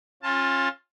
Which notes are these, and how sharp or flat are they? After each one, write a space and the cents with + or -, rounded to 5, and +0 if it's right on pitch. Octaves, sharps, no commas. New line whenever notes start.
C#4 -25 F4 +10 A5 +10